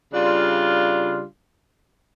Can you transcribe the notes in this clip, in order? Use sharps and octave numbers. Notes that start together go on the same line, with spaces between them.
C#3 G3 D4 F4